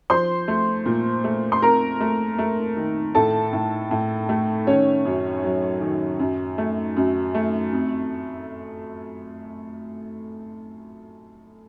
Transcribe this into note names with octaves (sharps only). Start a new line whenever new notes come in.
F3 C5 C6
A3
A#2
A3
C6
F2 A#4 A#5
A3
A3
D#3
A2 A4 A5
A2
A2
A3
D#3 C#4 C#5
F#2
F#3
D#3
F#2
A3
F#2
A3
F2